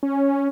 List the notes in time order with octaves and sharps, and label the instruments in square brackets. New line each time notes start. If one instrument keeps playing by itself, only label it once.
[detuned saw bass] C#4